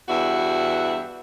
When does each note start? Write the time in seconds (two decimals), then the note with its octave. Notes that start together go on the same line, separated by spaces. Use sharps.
0.09 E2 G2 F#4 E5